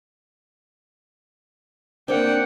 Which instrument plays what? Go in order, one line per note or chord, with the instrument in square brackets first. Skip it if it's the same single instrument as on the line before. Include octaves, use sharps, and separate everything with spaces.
[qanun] A#3 C4 [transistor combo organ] D4 [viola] F#5 G5